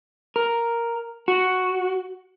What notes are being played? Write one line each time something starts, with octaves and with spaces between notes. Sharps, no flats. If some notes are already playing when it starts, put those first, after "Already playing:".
A#4
F#4